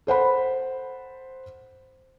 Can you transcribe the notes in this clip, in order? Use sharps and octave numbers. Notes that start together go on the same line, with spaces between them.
A4 C5 F#5 B5